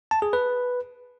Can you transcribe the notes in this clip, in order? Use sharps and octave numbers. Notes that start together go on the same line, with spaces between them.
A5
G#4
B4